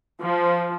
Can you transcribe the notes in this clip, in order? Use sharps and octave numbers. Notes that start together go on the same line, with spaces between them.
F3